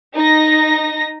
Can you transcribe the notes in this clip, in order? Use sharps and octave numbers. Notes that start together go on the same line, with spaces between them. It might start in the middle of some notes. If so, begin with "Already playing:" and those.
D#4 A#6